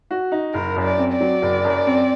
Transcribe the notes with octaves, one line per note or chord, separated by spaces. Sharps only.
F#4
D#4
F#1 A#4
F#2
D5
C4
D5
F#3
F#1
F#2
C4